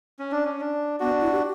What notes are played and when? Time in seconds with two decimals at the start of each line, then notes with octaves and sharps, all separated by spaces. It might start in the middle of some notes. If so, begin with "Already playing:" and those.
0.19 C#4
0.32 D4
0.45 C#4
0.60 D4
1.00 B3 D4 F#4
1.21 E4
1.31 G4